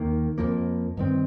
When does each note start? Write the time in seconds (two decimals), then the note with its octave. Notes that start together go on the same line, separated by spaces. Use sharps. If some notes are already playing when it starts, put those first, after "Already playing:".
Already playing: D#2 D#3 A#3
0.38 F2 F3 A#3
0.97 G2 D#3 C4